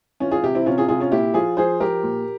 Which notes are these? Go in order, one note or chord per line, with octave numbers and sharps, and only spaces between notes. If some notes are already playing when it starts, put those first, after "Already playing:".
E3 C#4 F4
F4 G#4
C3 E4 G4
C4 E4
C3 C#4 F4
F4 G#4
C3 F4 G#4
C#4 F4
A#2 E4 G4
F3 F4 G#4
F3 G#4 C5
F3 G4 A#4
A#2